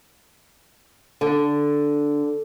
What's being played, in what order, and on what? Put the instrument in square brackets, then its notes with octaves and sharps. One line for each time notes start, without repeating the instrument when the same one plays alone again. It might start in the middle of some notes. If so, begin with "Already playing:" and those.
[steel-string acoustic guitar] D3